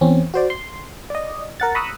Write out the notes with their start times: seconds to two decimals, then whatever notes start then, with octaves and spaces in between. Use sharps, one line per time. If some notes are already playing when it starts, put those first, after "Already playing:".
0.01 E2 C4 C#4
0.34 F#4 C5 D5
0.50 C6
1.10 D5 D#5
1.60 A#4 F#5 A6
1.75 A#5 B5 C#6 D#6 E6 F#6